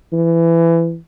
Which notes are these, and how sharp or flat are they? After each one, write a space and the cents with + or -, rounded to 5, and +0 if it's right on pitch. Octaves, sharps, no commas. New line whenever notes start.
E3 +20